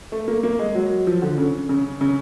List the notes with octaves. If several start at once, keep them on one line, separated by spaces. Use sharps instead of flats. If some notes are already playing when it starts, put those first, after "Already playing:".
A3
A#3
A#3
G#3
F#3
F3
D3
C#3
C#3
C#3